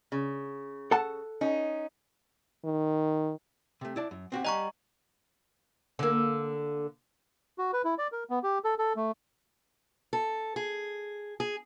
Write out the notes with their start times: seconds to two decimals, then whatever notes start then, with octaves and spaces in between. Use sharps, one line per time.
0.12 C#3
0.91 A4 F#5 A5
1.41 C#4 D#4
2.65 D#3
3.81 C3 A3
3.96 E4 D5 A5
4.11 F#2
4.32 C4 F#4 G4
4.45 G3 D#5 F#5 G#5 A#5 C#6
5.99 D3 A#3
7.58 F#4
7.73 B4
7.84 E4
7.98 D5
8.12 A#4
8.30 B3
8.43 G4
8.64 A4
8.78 A4
8.96 A3
10.13 A4
10.56 G#4
11.40 G#4